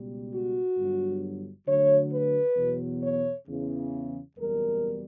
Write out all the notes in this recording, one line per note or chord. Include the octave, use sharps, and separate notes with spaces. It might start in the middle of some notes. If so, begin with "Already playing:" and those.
Already playing: C#2 B2 G3
F#4
G1 G2 F#3
D2 D3 F#3 C#5
B4
E2 B2 F#3
C#5
E2 C#3 E3
F#1 E2 B2 G3 A#4